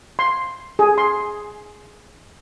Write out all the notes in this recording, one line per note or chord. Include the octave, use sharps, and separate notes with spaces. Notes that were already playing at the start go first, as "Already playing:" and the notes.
C6
G#4
C6